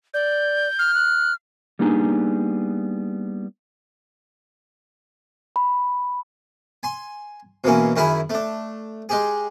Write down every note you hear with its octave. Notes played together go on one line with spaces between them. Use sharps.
D5 G6
F6
F#6
G3 A#3 B3 D4 D#4 G#4
B5
G#5 C6
B2 E3 A#3 C#4
F#2 D#3 E4 G#4 G#5 B5
A3 D4
G#3 G4 G#4